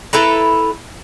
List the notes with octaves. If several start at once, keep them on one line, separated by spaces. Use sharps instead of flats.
E4 A4 B4 A#5